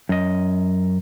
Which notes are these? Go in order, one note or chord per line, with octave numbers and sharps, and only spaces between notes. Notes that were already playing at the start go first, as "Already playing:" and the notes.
F#2 D#5